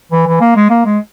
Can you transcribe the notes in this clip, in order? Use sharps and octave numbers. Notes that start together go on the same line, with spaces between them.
E3
E3
A#3
G#3
A#3
G#3